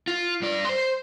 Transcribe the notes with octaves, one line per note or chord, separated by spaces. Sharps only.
F4
G2 D5
C5 C6